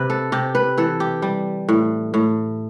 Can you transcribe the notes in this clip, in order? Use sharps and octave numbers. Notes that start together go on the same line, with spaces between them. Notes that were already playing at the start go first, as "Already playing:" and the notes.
Already playing: C3 B4
A4
C3 G4
B4
E3 A4
G4
G3
A2
A2